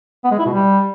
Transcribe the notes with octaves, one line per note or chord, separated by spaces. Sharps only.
B3
G#3
E4
B2
G3